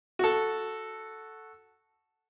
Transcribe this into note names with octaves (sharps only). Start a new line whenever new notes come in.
F#4 A4